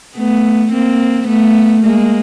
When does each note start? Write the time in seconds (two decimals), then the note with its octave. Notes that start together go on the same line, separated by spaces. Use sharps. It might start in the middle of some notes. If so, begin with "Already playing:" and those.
0.17 A3 B3
0.72 A#3 C4
1.28 A3 B3
1.84 G#3 A#3